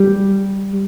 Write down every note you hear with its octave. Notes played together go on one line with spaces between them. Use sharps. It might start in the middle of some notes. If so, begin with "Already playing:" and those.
Already playing: G3